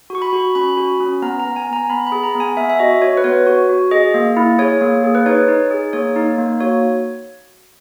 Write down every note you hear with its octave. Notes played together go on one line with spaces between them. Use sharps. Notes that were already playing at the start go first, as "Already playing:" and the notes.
F#4 C#6
B5
F#4
C#4 B5
F#4
C#4
B3 A#5
A#5
B3
G#5
B3
A#5
B3 B5
B5
G#4
A#5
B3
G#5
B3 E5
E5
F#4 D#5
F#4 C#5
B4
B3 C#5
F#4
F#4
G#4 D#5
A#3
E4
G#4 C#5
A#3
G#4
B4
D#4 C#5
D#4
G#4
A#3 C#5
D#4
A#3
F#4 C#5